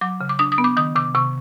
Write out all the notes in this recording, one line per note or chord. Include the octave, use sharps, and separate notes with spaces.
F#3 D6
C#3
D6
D4 D#6
D#6
B3
D6
D#3 D#6
C3 D6
C3 C#6